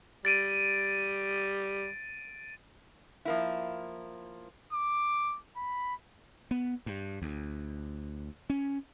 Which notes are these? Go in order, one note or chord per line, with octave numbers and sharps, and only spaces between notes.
G3 A6 D7 D#7
F3 A#3 E4
D6
B5
B3
G2
D2
C#4